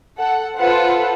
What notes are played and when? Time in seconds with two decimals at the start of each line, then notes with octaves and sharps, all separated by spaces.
0.19 A4 F#5
0.58 F4 A4 B4 C5 F#5